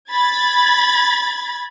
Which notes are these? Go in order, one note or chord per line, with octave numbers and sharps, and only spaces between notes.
B5 G#6 A6